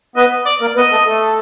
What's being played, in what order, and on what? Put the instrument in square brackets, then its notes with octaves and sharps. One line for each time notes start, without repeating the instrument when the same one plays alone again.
[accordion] B3 B4 [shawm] D#5
[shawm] D5
[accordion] A#3 A#4
[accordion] B3 B4 [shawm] D#5
[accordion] A3 A4
A3 A4